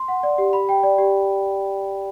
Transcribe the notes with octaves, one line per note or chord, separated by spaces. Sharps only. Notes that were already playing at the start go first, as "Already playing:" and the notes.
Already playing: C6
F#5
D5
G4
B5
G5
D5
G4